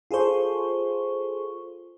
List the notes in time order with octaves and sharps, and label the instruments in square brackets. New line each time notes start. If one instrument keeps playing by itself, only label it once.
[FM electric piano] F4 G#4 A4 C5 C#6